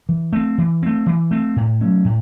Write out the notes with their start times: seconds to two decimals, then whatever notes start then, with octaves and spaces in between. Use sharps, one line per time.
0.09 E3
0.33 A3 C4
0.58 E3
0.83 A3 C4
1.06 E3
1.31 A3 C4
1.56 A2
1.81 F#3 A3 C#4
2.05 A2